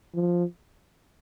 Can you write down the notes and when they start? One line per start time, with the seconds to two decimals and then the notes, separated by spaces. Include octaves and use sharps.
0.15 F3